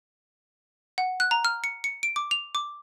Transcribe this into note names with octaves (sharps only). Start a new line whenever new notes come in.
F#5
F#6
A#5
F6
C#7
C#7
D7
D6
F7
D6